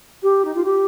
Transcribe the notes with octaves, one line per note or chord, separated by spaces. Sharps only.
G4
D#4
F4
G4